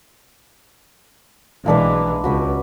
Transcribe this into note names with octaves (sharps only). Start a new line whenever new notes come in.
B1 E3 G#3 A#3 D4 B4
C#2 F#4 B5 D#6